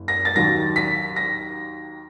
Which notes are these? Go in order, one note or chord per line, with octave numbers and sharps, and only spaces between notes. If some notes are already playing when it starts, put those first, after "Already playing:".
Already playing: F#1
A#6
A6
D#2 D#3 F#3 A#6
B6
A#6